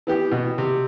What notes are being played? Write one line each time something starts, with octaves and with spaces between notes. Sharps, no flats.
E3 B3 G4
B2
C3